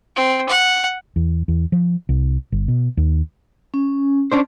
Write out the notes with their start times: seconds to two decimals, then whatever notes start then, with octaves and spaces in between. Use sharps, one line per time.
0.16 C4
0.49 F#5
1.16 E2
1.48 E2
1.72 F3
2.09 C2
2.52 G1
2.68 B2
2.97 D#2
3.74 C#4
4.32 C#4 D4 C5